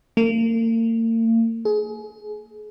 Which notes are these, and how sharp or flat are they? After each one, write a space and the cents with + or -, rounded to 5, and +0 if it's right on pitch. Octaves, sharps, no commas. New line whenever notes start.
A#3 -40
G#4 +30